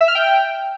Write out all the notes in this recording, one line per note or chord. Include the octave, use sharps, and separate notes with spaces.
E5
F6
G5